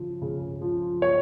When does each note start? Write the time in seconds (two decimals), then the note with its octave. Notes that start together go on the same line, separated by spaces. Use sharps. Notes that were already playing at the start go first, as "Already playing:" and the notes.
Already playing: C#3 F3
0.22 C#3
0.61 F3
1.02 C#5